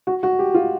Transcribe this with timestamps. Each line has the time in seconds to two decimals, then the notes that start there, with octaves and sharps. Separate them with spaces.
0.07 F#4
0.23 F#4
0.39 G4
0.54 F4